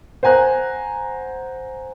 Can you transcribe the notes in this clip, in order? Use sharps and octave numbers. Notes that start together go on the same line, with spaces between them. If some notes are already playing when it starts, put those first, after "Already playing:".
C5 F#5 G#5 A#5 F#6